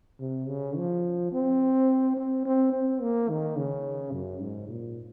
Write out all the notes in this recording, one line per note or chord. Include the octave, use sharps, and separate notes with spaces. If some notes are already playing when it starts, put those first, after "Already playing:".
C3
C#3
F3
C4
C4
C4
C4
A#3
D#3
C#3
F#2
G#2
A#2